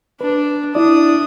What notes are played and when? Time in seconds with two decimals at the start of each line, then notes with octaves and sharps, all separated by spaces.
0.21 D4 B4
0.75 D4 E4 D5 D#6